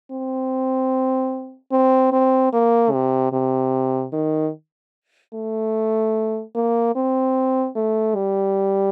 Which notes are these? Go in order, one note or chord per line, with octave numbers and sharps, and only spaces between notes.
C4
C4
C4
A#3
C3
C3
D#3
A3
A#3
C4
A3
G3